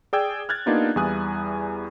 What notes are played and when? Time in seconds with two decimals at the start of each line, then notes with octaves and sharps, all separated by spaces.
0.13 G#4 D5 G5 E6 G#6
0.49 F6 F#6 G#6 A6
0.66 A#3 B3 D4 D#4 F4 G4
0.96 E2 G3 E4 G#5 D#6 F#6